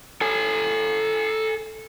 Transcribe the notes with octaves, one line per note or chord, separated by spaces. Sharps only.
A4 G#5